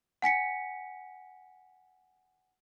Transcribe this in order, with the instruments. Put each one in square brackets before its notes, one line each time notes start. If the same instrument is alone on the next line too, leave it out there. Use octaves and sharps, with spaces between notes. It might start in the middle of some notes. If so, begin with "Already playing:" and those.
[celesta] F#5 G#5 B6 C#7